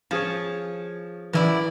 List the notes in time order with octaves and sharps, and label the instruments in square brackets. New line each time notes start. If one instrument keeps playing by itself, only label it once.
[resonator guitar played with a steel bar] F3 [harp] C#4 G#4 C#5
[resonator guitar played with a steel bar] F#2 E4 D5 [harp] E3